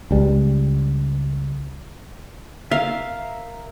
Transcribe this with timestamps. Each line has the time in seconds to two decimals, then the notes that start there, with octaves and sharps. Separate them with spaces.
0.11 C#2 G3
2.71 A#4 E5 F5